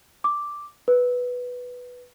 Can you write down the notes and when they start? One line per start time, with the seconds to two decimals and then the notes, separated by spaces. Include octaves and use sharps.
0.24 D6
0.88 B4